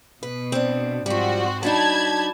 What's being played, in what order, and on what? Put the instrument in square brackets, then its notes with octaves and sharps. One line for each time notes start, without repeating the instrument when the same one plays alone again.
[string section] B2 [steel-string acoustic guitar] B4
[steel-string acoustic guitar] C4 D4
[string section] G#2 C4 F#4 [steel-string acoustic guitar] F3 G3
[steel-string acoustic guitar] F#3 D4 D#4 [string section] A5 B5 G#6